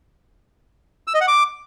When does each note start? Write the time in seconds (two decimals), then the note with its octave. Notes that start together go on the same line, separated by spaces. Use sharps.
1.07 E6
1.14 D#5
1.21 F#5
1.28 D6